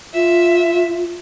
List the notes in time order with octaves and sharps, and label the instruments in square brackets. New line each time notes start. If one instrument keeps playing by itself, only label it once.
[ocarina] F4 [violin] E5